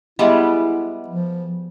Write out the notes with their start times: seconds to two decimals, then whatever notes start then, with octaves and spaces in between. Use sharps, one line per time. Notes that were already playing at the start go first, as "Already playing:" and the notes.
0.19 G3 G#3 B3 E4 D#5 E5 F#5
1.08 F3